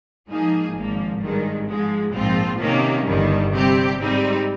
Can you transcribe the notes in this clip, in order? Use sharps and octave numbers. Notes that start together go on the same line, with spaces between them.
G#2 F3 A#3 D#4 G#4
G#1 G#2 F3 A#3
G#1 G2 D#3 G#3
G#2 F3 G#3
A#1 G#2 F3 C4 F4
C3 D#3 A#3 C#4
G1 G2 D#3 G3
C3 G3 C4 G4
G#2 G3 C4 D#4